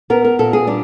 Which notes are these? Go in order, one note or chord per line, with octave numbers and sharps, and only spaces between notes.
B3 A#4
A#4
A#2 A4
G#4
G3 D4